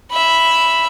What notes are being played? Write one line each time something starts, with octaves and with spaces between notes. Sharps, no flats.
E5 B5